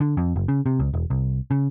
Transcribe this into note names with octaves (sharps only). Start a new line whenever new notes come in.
D3
F2
F#1
C#3
C3
C#2
E1
C2
C#3